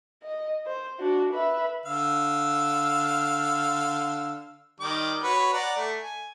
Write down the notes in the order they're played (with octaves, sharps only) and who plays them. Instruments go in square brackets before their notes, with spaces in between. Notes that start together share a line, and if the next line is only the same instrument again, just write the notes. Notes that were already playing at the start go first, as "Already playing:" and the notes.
[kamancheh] D#5
C5
D4 F#4
B4 E5
[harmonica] D3 F5 E6
D#3 G3 D6
F#4 B4 C#5
D5 F#5 A#5
A3
G#5